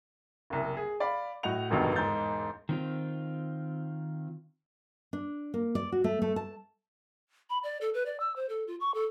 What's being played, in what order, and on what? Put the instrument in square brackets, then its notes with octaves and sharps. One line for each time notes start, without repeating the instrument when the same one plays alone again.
[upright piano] F#1 C2
G#4
D5 F5 B5
A2 F#4 D#5 F#5 F7
F1 A#1 E2 G2 B2 D#3
E1 G#2 D#4 G6 A6
[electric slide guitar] D#3 C4 F4
[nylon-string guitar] D4
A#3
D5
F#4
A3
A3
A5
[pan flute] B5
D5
A4
B4
D5
E6
C5
A4
F4
C#6
A4